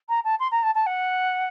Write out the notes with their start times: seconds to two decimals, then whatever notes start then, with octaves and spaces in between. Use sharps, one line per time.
0.09 A#5
0.24 A5
0.40 C6
0.51 A#5
0.63 A5
0.75 A5
0.86 F#5